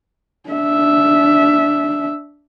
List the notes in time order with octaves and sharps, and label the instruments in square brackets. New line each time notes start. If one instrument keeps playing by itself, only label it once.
[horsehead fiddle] D4 E5